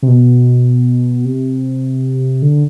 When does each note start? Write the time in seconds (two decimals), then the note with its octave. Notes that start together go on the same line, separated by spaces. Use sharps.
0.02 C3
0.08 B2
1.25 C3
2.42 D3